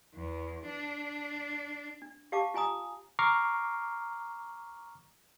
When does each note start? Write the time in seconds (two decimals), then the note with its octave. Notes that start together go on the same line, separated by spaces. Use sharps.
0.15 E2
0.65 D4
2.02 D4
2.32 G4 F5 A5 D6
2.54 F4 G#5 A#5 D#6
3.19 A#5 C#6 D6 F6 C7